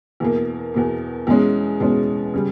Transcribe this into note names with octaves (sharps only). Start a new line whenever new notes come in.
E2 B2 A#3
E2 B2 A#3
E2 B2 G#3 C#4
E2 B2 G#3 C#4
C#3 G3